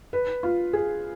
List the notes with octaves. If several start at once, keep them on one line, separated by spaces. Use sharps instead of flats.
B4
F4
G#4